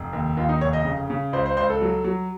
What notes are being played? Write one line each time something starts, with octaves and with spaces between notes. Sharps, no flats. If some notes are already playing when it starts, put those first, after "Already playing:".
Already playing: F1
D#2
D#2 F4
D#4
F1 C#5
D#5
C#3
C#3
C#2 C5
C5
C#2 C5
A4
F#3
F#3